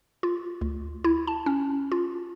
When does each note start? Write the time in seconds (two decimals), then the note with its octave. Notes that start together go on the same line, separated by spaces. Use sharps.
0.23 F4
0.61 D2
1.04 E4
1.27 A5
1.46 C#4
1.92 F4